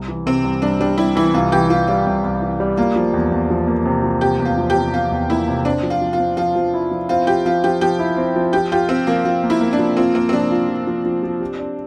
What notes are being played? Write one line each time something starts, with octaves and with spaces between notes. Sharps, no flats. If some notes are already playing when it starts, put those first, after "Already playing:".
Already playing: C2
E3
C3 C4
C2
G3 D4
G3 D4
G3 E4
E3 E4
C2 F4
E3 G4
E3 F4
G3 F4
C2
C2
E3
G3
A#3 F4
F3
E2
E2
F3
A#3
C3
F3
C3 G4
E2
F4
F3
G4
C3
C3 F4
E2
A#3 E4
C3
C4 D4
F3
F4
F3
F4
C4
F3 F4
F3
E4
F3
C4 F4
F3 G4
F3 F4
F3 G4
F3 G4
E4
C4
F3
F3 G4
F4 G4
C4 F4
F3 A#3
F3 F4
A#3
E4
A#3
D4
F3
C4 F4
A#3 C4
C4
F3 D4
F4
F3
F3
F3
F3
G4
D4